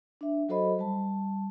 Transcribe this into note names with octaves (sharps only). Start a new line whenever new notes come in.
D4 E5
F#3 F#4 A4 C5 D#5 B5
G3 A5